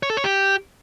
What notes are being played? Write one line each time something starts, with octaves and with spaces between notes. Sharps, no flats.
C#5
A4
C#5
G4